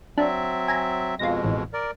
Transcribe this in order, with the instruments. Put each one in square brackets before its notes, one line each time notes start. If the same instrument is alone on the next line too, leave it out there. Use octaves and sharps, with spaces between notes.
[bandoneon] F#3 C4 E5 [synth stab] D4
[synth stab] G#5 A#5
[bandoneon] F2 B2 G#3 [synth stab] F4 A#6
[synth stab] A1
[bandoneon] A#4 D5